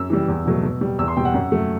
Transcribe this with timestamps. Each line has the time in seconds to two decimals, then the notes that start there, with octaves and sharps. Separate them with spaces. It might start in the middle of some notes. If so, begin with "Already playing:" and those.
Already playing: F#2 E6
0.10 E3 G3
0.28 E2
0.46 B2 F#3 A3
0.63 B2
0.81 G3
0.99 E2 E6
1.08 C6
1.17 B2 G3 G5
1.25 F#5
1.34 F#2
1.52 F#3 A3